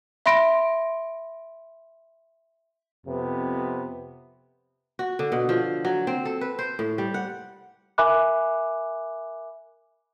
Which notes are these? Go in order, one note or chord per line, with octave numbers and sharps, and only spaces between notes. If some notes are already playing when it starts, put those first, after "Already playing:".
E5 B5 C6 A#6 D7
F2 C3 B3
F#4
D3
B2
F3
F#3
C4
A4
B4
C5
A2
G3
F#5
A#4 E5 G#5 B5 D6 F#6